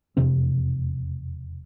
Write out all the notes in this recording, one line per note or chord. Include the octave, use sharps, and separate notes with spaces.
E1 F2 C3 C4